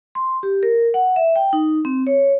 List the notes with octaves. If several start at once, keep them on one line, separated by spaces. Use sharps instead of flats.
C6
G4
A#4
F#5
E5
G5
D#4
C4
C#5